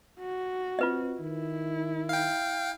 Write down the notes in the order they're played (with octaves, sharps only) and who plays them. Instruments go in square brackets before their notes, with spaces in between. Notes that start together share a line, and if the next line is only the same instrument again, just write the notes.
[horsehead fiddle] F#4
[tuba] C4 [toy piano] F4 B4 D#5
[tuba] D#3 [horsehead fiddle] E4
[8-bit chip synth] F5 G5